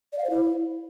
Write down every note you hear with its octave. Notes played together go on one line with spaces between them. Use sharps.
D5
F5
C5
E4